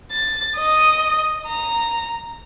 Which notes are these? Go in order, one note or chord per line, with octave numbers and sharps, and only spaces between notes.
A6
D#5
A#5